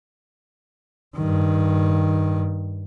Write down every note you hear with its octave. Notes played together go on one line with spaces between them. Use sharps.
G2 D#3